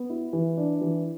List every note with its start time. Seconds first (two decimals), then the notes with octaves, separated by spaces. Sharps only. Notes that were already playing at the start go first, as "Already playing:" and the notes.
Already playing: B3
0.10 E4
0.33 E3
0.57 D4
0.81 E3